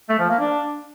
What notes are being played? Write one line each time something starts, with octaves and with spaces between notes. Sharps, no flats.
A3
F3
A#3
D4